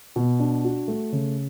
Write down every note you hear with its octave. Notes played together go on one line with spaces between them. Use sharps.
B2
D4
F#4
A3
C#3